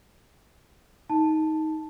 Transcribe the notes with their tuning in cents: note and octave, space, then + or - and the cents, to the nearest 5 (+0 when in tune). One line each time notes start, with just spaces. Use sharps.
D#4 +15 A5 +0